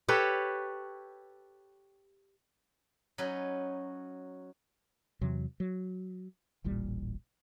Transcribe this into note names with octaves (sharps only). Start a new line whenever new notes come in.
G4 A4 B4 C#5
F#3 C#4 D#4 B4
E2 C3 E3 F#3
F#3
D#1 A1 A#2 G3